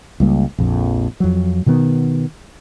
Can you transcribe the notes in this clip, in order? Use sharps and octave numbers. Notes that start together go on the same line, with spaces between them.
C#2 G3 A#3
A#1 F2
F2 F#3
B2 D#3 E3 B3